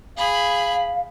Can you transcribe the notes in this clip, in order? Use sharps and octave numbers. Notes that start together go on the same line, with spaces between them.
G#4 F5 B5